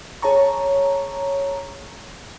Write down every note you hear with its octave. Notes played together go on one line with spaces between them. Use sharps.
G#4 C#5 A5 A#5 C#6